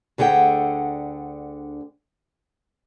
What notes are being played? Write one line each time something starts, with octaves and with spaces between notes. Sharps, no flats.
D2 D3 G#4 F#5 G5